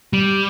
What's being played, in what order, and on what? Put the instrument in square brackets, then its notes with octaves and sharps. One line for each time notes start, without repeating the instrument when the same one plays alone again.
[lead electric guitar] G3